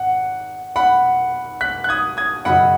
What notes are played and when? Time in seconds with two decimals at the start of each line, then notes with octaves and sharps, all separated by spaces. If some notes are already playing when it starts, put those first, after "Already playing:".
Already playing: G#1 F#5
0.76 F#5 B5
1.61 F#6 B6
1.84 F#6
1.89 D#6 G#6
2.17 D#6 G#6
2.45 F#2 C#3 F#3 D#4 F#5 B5